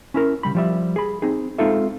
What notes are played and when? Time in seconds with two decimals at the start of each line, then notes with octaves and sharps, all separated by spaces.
0.14 C#4 E4 A#4
0.43 C#3 G3 B5
0.55 F3 G3 E5
0.96 G#4 B5
1.22 C4 D#4 G#4
1.58 G#3 C4 D#4 F4 A4 E5